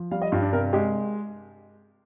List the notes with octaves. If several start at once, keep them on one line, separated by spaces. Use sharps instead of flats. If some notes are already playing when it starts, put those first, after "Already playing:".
Already playing: F3
G3 F5
D#5
G2 F4
D4
C3 A#4
G#3 G4